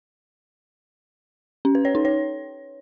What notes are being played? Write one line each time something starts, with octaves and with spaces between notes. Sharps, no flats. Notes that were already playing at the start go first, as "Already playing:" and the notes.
C#4
B4
C#5
D#4
C#5